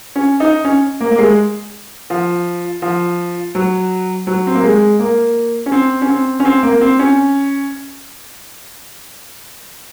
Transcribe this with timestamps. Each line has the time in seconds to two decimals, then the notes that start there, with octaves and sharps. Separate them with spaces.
0.15 C#4
0.40 D#4
0.64 C#4
1.00 A#3
1.11 A#3
1.19 G#3
2.10 F3
2.82 F3
3.55 F#3
4.27 F#3
4.47 C4
4.55 A#3
4.64 G#3
5.00 A#3
5.66 C#4
5.72 C4
6.02 C#4
6.09 C4
6.40 C#4
6.45 C4
6.63 A#3
6.81 C4
6.99 C#4